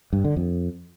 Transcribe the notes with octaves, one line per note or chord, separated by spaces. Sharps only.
G2
D3
F2